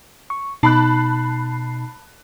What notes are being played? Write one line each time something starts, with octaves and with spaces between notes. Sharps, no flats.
C#6
B2 D#4 A5 B5 F#6 C7